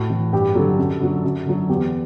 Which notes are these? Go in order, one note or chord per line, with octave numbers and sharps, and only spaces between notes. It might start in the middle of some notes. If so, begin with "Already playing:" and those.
Already playing: A2 F#4
E3
G2 G4
D3 F#3 A4
F#2
D3 F#3
F#2
D3 F#3
E2 G4